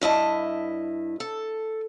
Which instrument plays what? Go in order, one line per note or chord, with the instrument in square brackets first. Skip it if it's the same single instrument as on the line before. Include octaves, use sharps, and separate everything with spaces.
[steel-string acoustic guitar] G2 E4 D#5 A5
A4